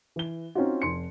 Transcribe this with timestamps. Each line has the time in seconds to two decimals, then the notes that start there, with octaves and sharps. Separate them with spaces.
0.16 E3 G7
0.55 C4 C#4 D#4 F4 F#4
0.82 F1 C6 C#7